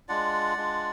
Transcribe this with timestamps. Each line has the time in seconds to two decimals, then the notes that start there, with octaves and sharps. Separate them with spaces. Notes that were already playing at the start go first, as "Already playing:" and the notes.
0.09 G#3 D4 F4 D5 F#5
0.57 G#3 D4 F4